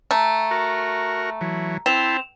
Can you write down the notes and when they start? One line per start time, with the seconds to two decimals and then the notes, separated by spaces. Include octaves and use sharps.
0.11 A3 A#5
0.51 F#4 A#4
1.41 E3 F#3
1.86 C4 E4 C5 A5 E7 F7